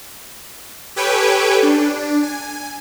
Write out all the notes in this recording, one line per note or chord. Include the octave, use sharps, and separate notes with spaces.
G4 A4 B4 C#5 G5 G#5
D4
G#5